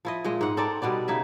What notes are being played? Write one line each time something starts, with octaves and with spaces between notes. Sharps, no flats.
F3 E4 D#5
A#2 G#3 D#5
G#2 F#5
C4 A4 A#4 D5
B2 G3 B3 D5
C#3 D#4 E4 E5